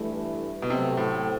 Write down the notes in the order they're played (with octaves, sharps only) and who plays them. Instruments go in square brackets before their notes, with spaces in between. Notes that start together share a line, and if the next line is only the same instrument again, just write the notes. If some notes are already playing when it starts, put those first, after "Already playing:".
Already playing: [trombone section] G2 E3 A3 E4
[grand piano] B2
[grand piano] C3 [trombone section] F#3 A3 C4
[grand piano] A2